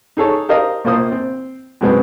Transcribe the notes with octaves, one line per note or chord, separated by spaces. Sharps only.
D#4 G#4 A4 C#5
G4 A#4 C5 D#5 F5
A#1 A#2 A#3 C5 D#6
C4
F#2 B2 G#3 B3 C4